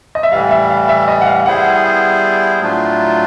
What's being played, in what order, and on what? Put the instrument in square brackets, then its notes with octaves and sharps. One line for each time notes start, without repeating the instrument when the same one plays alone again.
[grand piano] D#5
E5
[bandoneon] G3 [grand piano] F5
[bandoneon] A2 E3
[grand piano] E5
F5
E5
D#5
F#5
F5
[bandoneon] G3 B3 E4 G#4 C5 [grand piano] F#5
[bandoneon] A2 F#3 A3 D4 F4